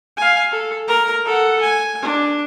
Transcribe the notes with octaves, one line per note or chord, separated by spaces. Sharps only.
F5 G#5
A4
A#4 A#5
A4 F#5
G#5
D4